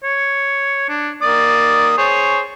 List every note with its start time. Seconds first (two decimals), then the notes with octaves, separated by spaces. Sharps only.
0.04 C#5
0.89 D4
1.22 A#3 D5 D#6
1.98 G#4 C5 C#5